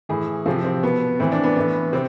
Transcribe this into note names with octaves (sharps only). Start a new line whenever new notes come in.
A2 E3 G#4
C3 F3 C4
C4
B2 B3
A2 E3 C4
D4
B3
A2 E3 B3
C3 C4